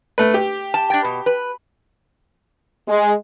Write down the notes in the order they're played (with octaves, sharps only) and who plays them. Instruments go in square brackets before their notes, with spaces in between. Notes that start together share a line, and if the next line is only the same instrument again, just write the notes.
[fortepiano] A3 B4
G4
[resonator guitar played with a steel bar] A5
D4 G5
B2
B4
[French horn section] G#3